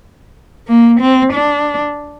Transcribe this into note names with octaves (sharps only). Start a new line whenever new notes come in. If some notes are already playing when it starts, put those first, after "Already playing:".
A#3
C4
D4